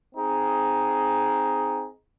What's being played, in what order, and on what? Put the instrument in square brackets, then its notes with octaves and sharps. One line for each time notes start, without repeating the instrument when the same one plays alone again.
[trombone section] C4 D#4 G#4